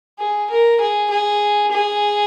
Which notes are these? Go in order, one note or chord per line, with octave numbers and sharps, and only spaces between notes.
G#4
A#4
G#4
G#4
G#4